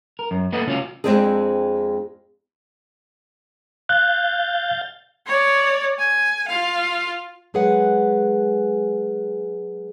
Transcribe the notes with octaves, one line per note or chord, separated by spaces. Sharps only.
A#4
F#2
A3 A#3 A4 B4 D#5 F#5
C#3 C#4 F4 F#4 D#5 F5
F2 A#2 G#3 C4 D4 G#4
F5 F#6 G6 A6
C#5 D5
G#5
F4 F5
F#3 G#3 G#4 B4 F#5